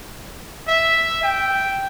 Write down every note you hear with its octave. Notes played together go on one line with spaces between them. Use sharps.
E5
G5